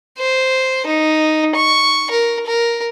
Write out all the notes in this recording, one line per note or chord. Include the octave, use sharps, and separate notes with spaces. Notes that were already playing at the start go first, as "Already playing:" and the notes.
C5
D#4
C#6
A#4
A#4